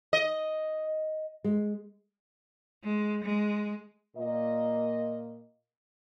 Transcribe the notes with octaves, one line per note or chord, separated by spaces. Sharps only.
D#5
G#3
G#3
G#3
A#2 A#3 D#5